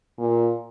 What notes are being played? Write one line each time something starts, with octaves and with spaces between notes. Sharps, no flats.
A#2